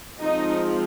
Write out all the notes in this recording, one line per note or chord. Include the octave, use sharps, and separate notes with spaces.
F3 G#3 C4 D#4 D#5